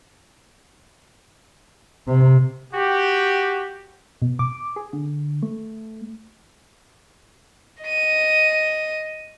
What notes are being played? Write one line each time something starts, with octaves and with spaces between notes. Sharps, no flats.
C3
F#4 G4
B2
D6
G#4
D3
A3
D#5 D#7